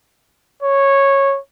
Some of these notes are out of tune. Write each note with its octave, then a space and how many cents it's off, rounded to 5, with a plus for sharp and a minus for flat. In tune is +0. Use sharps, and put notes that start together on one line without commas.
C#5 -10